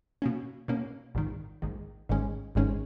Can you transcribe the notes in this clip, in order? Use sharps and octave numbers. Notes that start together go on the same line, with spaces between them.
B2 A#3 C#4
B2 A#3 C#4
A#1 G#2 D#3
A#1 G#2 D#3
G#1 G#2 D#3 G#3 C#4
G#1 G#2 D#3 G#3 C#4